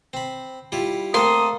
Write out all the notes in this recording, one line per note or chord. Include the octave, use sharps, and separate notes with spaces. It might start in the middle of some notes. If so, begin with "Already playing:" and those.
C4 B5
G3 E4 F4
A3 A#3 C4 A4 C6 D#6